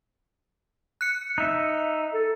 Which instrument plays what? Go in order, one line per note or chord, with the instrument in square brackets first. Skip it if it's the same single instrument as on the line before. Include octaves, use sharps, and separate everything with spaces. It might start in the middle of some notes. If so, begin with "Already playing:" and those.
[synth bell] F#6 C#7
[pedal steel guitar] D#4 E5
[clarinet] A4